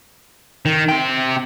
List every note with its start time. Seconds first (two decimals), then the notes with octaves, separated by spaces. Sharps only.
0.65 D#3
0.89 C3 G5